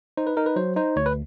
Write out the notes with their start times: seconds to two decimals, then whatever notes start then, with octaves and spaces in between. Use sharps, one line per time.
0.17 D#4 C5
0.27 B4
0.37 D#4 A#4
0.46 B4
0.56 F#3 C5
0.76 D#4 C5
0.96 D2 C#5
1.06 B4